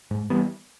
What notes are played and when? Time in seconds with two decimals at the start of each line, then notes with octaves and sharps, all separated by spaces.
0.11 G#2
0.30 E3 G3 B3